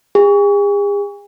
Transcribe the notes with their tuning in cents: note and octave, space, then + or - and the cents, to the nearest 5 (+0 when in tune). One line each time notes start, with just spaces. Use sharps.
G#4 -40